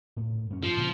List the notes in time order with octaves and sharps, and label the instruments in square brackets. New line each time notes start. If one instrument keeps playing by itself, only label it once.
[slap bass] A2
F#2 C#4
[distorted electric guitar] F3
[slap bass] A#2 C#3 C4